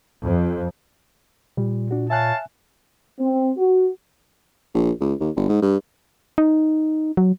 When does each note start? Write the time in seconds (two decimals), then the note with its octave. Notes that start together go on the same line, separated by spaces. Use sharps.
0.24 F2
1.57 A#2 G3
1.91 D4 F#4
2.10 C#5 E5 F5 G#5 A5 F#6
3.20 C4
3.57 F#4
4.75 A#1
5.01 C#2
5.21 D#2
5.36 G1
5.49 G#2
5.63 G2
6.38 D#4
7.17 F#3